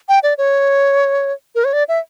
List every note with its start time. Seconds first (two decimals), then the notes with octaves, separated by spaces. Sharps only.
0.09 G5
0.23 D5
0.38 C#5
1.55 A#4
1.64 C#5
1.73 D5
1.88 E5